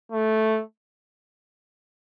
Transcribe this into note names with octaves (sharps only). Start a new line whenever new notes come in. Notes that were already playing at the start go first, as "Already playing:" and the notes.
A3